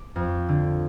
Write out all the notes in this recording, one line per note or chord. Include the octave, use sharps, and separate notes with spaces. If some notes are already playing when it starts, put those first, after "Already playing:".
Already playing: D6
F2
D3